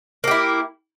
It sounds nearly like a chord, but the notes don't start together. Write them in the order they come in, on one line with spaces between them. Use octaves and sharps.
A#3 G4 E4